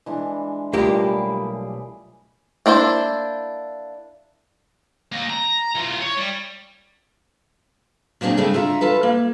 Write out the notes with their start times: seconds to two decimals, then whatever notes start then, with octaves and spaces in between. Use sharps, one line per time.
0.06 E3 G#3 D4
0.73 B1 G3 A3 A#3 F4 G4 G#4
2.66 A#3 D4 E4 C5
5.12 A#3 D#5
5.30 A#5
5.75 E3 F4
6.00 C#5
6.17 G3
8.21 A#2 F#3 A#3 C4 D4 G#4
8.37 C#3 G#3 A3 C4 D4
8.53 D3 F4 E5 A#5
8.81 F4 A4 B4
9.03 A#3